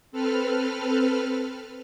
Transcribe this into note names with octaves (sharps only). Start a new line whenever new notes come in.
C4 A4 B4 F6